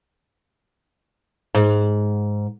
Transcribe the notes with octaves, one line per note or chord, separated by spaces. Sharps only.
G#2